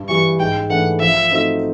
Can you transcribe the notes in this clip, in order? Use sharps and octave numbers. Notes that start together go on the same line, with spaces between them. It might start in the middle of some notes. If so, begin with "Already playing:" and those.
Already playing: G2
E3 G3 C#6
G#2 G5
E3 A3 D4 F#5
F3 E5
A3 C4 D#4 F#4